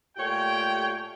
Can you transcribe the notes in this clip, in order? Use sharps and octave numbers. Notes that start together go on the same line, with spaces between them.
A#2 A3 G4 C#5 G5